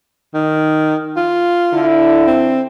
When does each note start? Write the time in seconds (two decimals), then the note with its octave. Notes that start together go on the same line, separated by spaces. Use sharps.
0.34 D#3
1.16 F4
1.73 D3 E4
2.27 C4